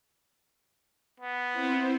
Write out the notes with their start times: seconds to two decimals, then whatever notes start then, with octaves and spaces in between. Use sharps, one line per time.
1.20 B3
1.51 C4 E4 C5